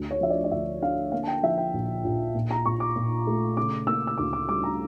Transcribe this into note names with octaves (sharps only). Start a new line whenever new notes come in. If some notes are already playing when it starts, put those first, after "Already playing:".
Already playing: D2
C#5
F3 E5
D5
D5
D2 E5
D3 F5
A#3 F5
A5
G5
F3 E5
G5
A#1
A#1
A#2
A#5
A#2 C#6
D6
A#2
A3
C#3 D6
A#3 E6
E6
D2 D6
D6
G3 D6
A#5